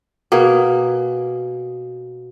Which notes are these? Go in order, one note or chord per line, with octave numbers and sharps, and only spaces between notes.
B2 A#3 G#4